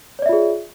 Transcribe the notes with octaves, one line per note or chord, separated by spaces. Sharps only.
F4 G#4 C#5 D5 E5